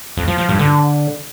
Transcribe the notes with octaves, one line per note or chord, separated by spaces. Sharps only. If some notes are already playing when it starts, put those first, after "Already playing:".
F2
F3
F3
G2
D3